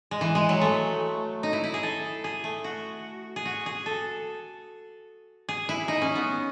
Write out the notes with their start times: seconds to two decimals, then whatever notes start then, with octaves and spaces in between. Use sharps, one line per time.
0.11 G#3
0.21 E3
0.35 G#3
0.49 F#3
0.61 A3
1.43 D#4
1.53 E4
1.64 E4
1.74 G#4
1.83 A4
2.24 G#4
2.44 A3
2.64 F#4
3.36 G#4
3.46 F#4
3.66 G#4
3.86 A4
5.49 G#4
5.69 E4
5.88 D#4
6.02 C#4
6.15 B3